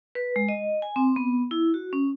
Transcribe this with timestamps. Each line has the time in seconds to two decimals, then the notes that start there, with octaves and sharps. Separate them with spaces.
0.15 B4
0.36 G#3
0.49 D#5
0.82 G#5
0.96 C4
1.16 B3
1.51 E4
1.74 F#4
1.93 C#4